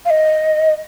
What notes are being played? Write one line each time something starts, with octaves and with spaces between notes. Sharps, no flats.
F5
D#5